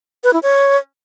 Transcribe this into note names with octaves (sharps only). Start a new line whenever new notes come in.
B4
E4
C#5